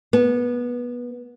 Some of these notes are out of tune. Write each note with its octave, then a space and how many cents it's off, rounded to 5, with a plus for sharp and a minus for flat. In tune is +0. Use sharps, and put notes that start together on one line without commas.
B3 -20